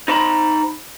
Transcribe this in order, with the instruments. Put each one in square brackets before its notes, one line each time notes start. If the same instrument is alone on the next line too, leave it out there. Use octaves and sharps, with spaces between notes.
[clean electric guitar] D#4 C5 A#5 B5